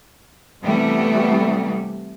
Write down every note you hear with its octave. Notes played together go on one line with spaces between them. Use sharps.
C3 E3 G3 A3 B3